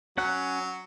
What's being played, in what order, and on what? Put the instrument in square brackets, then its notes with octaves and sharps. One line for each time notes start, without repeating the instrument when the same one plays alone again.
[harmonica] F#3 [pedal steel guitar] C#4 F#5 F#6